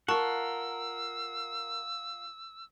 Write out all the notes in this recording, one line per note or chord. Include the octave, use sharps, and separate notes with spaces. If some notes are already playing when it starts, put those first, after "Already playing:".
F4 A#4 F#5 A5 C#6 E6